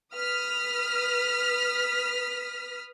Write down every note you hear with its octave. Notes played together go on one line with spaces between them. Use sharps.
B4 D#6 F6 B6